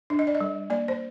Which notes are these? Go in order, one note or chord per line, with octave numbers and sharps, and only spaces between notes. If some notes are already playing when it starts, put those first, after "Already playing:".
D4
D#5
D5
D#5
G3
A#3 D5
C5